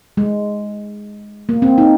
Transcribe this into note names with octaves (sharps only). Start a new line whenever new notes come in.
G#3
A#3
C4
D#4